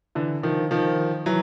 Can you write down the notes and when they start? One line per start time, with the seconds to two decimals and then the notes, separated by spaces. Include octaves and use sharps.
0.15 D3 E3
0.43 D#3 F3
0.71 D#3 F3
1.26 E3 F#3